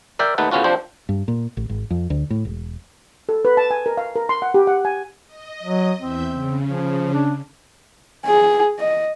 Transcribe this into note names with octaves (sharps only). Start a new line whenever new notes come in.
A#4 D5 E5 G5
D#2 A3 D#4 B4 F#5 A5
A2 C#3 B3 C#4 F4 F#4
F3 C4 D4 G4 C5
G2
A#2
A1
G#1
F2
D2
A2
E1
A4
B4
A5
G#5
A#4
F5
A#4
C6
F#5
G4
F#5
G#5
D#5
F#3
E2 C4 E5 G6
C#3
F3
D4
G#4
D#5